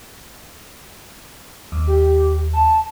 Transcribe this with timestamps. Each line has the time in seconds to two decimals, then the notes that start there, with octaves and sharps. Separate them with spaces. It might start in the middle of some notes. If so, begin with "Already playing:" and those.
1.72 D#2
1.87 G4
2.53 A5